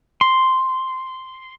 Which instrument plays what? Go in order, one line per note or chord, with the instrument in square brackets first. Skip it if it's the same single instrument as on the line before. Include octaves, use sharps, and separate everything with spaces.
[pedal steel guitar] C6